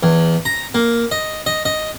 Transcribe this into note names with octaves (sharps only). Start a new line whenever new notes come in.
E2
A#5
A#3
D#5
D#5
D#5